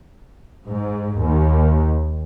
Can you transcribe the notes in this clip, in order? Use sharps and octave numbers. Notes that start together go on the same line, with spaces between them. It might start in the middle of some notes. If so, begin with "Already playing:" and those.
G#2
D#2